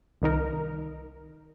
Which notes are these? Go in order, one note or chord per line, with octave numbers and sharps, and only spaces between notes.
C2 D#3 D#4 A#4